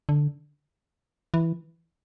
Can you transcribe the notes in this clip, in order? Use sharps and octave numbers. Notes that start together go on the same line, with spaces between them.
D3
E3